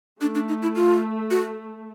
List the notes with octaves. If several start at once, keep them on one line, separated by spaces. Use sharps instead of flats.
A3 D4
D4
D#4
E4
F4
F#4